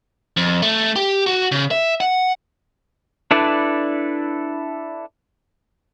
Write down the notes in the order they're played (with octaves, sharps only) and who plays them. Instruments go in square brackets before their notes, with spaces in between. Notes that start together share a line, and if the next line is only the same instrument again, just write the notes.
[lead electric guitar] F2
A3
G4
F#4
C#3
E5
F#5
[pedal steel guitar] D4 E4 A4 B4 D5